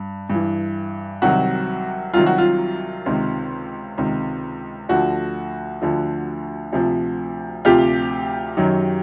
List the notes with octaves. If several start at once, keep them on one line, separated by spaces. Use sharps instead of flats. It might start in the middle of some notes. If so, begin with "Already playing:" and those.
Already playing: G2
G2 E3
C2 C3 D#3 F#3 F#4
C2 C3 D#3 F#3 F4
F#4
F4
C#2 C3 D#3
C#2 C3 D#3
D2 D3 F3 F#4
D2 D3 F3
D2 C3 F3
D2 C3 F3 F4 G4
F#2 D#3 F#3